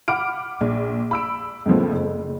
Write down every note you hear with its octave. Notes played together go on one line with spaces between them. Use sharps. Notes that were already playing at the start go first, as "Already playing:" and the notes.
F#5 B5 D6 F6 D7
A#1
B5 E6 D7
F2 A2 C#3 F3 B3
F#1